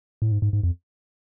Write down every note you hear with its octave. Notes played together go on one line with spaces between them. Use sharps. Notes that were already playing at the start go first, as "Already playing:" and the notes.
A2
G#2
G#2
G#2
F2